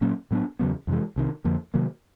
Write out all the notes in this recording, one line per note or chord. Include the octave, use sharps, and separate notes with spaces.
A#2 F#3 A#3 C#4
A2 F#3 B3 D4
E2 C#3 F#3 B3
F2 C3 E3 G#3
C2 C3 D#3
F2 D3 F3 A#3
C3 D#3 F#3 A#3